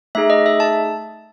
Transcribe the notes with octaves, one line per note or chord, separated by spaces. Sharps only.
A3 D#4 G#4 E5
D#5
E5
A5